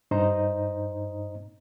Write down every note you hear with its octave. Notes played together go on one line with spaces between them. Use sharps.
G2 D#4 C5 D#5 A#5